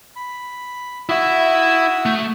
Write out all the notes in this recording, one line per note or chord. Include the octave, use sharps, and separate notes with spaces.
B5
E4 F#4 E5 D#6 E6
A3